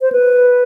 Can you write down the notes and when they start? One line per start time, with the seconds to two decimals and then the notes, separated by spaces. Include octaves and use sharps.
0.01 C5
0.12 B4